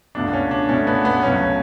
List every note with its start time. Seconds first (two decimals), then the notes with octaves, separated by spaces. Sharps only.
0.15 C#2 B2 A3 D4
0.33 C#4
0.51 D4
0.69 C#2 B2 A3 C#4
0.87 B3
1.05 B3
1.23 C#2 B2 F#3 A3 C#4